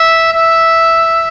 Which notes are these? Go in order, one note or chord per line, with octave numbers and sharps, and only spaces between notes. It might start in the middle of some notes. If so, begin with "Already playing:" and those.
Already playing: E5
E5